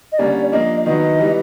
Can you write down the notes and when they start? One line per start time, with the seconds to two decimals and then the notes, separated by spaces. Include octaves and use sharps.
0.12 D#5
0.18 D3 G3 A#3 C#4 D5
0.52 F3 A#3 D4 D#5
0.85 D#3 F#3 B3 D#5
1.19 E3 G3 B3